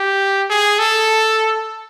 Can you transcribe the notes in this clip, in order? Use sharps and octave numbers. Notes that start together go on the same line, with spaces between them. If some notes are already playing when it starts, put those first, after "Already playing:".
Already playing: G4
G#4
A4